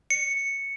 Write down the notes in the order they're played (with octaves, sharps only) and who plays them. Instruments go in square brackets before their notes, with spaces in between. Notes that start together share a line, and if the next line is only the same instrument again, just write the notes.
[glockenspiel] C#7